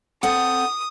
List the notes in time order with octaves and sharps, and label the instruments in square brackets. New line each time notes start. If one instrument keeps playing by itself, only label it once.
[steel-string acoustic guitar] C4 A4 F#5 [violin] D#6